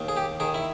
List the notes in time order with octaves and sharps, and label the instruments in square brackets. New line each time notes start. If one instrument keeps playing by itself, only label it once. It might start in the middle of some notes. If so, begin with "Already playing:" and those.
Already playing: [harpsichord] D#2
G#4
G4
D#3 G#4
E4